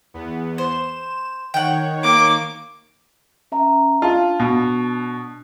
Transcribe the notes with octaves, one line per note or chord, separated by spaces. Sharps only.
E2 B3
C5 E7
D#3 C#5 F#5 G5
A#3 D6
C#4 E5 A#5
D4 F4 A5
B2